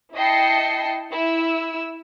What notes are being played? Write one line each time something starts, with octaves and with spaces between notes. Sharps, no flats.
E4 D#5 G5 A5 C7 C#7
E4 E6